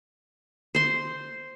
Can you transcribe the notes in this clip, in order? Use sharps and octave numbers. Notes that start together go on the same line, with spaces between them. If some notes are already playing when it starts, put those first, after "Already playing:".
C5 C6